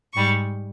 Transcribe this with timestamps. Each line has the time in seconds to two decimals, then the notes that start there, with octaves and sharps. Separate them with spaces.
0.13 G#2 G3 C#6